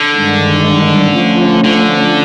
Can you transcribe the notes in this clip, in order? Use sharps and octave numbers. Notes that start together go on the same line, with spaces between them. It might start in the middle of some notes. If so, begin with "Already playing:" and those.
Already playing: D3
G2 D#3 G#3
F3 A3 C#4
D3